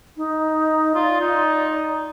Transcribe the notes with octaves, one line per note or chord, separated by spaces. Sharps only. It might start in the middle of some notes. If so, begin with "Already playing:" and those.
D#4
F4 D5
D#4